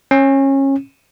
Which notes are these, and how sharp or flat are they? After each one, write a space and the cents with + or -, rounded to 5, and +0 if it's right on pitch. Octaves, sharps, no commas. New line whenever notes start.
C#4 -25